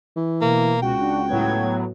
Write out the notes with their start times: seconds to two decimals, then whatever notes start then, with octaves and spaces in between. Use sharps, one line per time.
0.16 E3
0.41 B2 A#3
0.82 C#2 F#4 G5
0.99 D4
1.28 A2 F#3 B3 G#6